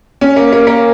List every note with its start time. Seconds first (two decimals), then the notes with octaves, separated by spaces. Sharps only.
0.21 C#4
0.36 A#3
0.52 A#3
0.67 A#3